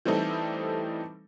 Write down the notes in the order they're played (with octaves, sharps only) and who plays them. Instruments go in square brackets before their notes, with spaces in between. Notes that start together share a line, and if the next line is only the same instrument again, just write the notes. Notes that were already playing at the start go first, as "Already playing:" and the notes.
[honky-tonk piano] E3 G3 A3 C4 D#4 A4